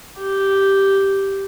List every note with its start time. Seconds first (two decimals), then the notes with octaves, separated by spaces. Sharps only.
0.18 G4